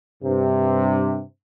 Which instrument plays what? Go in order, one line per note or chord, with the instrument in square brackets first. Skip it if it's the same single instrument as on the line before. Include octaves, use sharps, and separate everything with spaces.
[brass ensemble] G2 C3